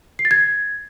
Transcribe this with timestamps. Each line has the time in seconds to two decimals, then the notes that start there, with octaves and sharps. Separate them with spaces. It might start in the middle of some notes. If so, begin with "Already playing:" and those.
0.19 C7
0.25 A6
0.31 G#6